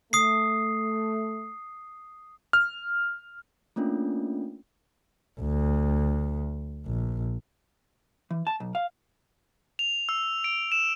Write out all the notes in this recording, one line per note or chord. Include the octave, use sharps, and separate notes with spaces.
A3 D#6 C7
F6
A3 A#3 C#4 D4 F4
D2
A#1
E3
A5
B1
F5
F7
E6
D7
E7